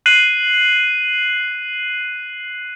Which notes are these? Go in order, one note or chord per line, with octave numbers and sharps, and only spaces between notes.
F#6 C7 D#7 F#7